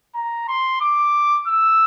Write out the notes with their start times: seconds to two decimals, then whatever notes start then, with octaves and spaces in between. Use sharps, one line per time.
0.14 A#5
0.48 C6
0.81 D6
1.47 E6